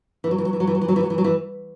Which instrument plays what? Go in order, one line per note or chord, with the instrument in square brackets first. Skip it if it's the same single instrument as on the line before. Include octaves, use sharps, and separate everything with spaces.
[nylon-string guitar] E3
F#3
E3
F#3
E3
F#3
E3
F#3
E3
F#3
E3
F#3
E3
F#3
E3